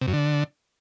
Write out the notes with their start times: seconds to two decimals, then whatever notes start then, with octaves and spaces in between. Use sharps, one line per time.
0.01 C3
0.08 F#2
0.14 D3